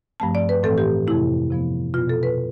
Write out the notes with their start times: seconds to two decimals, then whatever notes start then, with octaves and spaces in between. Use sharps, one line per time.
0.20 G2 F3 A3 C4 A5
0.35 D5
0.49 B4
0.63 A2 E3 A3 C4 A4
0.78 G4
1.07 F2 C3 F3 A3 E4
1.50 C3 F3 B3
1.94 B2 B3 F4
2.09 A4
2.23 B4